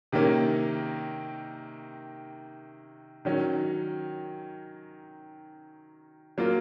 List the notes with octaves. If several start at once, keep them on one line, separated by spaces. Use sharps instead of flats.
C3 D#3 A#3 C#4
D#3 F#3 C#4
F#3 A#3 F4